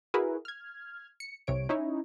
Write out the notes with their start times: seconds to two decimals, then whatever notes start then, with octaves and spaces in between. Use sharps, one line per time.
0.14 E4 F#4 G#4 A#4 B4
0.45 F6 G#6
1.20 C#7
1.47 C2 C3 C#5 D7
1.69 C#4 D#4 E4 C#5